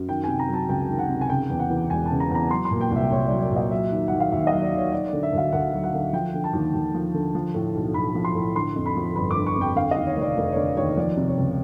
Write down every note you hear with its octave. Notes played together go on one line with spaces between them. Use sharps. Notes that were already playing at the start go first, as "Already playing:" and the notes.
Already playing: F#2
D#3 G5
C3 G#5
A#5
F#3 A5
C#2 G5
D#3
F#5
C3
G#5
C#3 G5
E2
F#5
E3
E1 G#5
C#3 A5
A#5
E2 A#5
F#3 C6
C6
A#2
G5
C2 E5
C2 C#5
F#3 D5
D5
A#2
D#5
F#3 E5
D#3
D#2 F#5
F5
D#2 E5
D#5
F#3
D5
D#3
C#5
F#3 D5
D5
D3
E5
D2 F5
D2 F#5
F#3
F#5
D3
F3 G5
D3
A5
D#2
D#2
F3
D3
F3
A2
B1
B1 B5
F3
C6
A2
D3 C6
F2
B5
F3
G1 B5
D6
D3
C#6
F2
G5
D3 F5
D#5
D#2
C#5
F1 C#5
D5
F1
C#5
D3 D5
D#2 C#5
F3 D5
C3
C#5
C#2